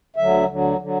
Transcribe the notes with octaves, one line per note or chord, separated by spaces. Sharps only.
D2 D3 F#3 E5
D2 D3 F#3
D3 F#3